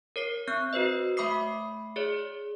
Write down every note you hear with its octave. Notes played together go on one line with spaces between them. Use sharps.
A#4 C#5 C7
C4 F#6 G6
F#4 B4 C5 D#5
A3 E5 B5 D6 D#6 C7
G#4 C#5 D5